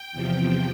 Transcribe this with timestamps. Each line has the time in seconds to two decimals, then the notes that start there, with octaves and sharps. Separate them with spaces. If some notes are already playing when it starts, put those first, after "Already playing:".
Already playing: G5
0.12 E2 C3 F3